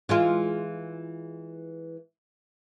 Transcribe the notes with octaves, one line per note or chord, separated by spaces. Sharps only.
E3 G#3 F4